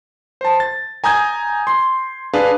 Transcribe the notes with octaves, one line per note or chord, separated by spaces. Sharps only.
C5 A5
A6
G#5 A#5 D#6 G6 G#6
C6
D4 G#4 B4 F5